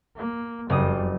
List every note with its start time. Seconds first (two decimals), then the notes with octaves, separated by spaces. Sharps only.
0.16 A#3
0.70 F#1 F2 G3 D#6